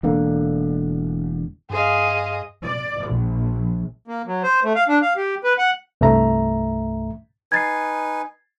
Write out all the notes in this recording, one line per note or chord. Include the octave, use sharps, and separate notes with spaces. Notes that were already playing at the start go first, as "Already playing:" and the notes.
E1 D3 A#3
G2 G#4 C5 D#5 F5
D5
A#1
A#3
F#3
C5
A3
F5
D4
F5
G4
B4
F#5
C2 G2 A3 E5 A#5
D#4 B4 G#5 G#6 A6 C7